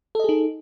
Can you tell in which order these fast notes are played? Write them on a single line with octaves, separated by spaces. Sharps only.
A4 D#5 G#4 D#4